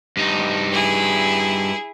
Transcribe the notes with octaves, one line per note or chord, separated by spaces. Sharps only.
G2 D#4
E4 G#4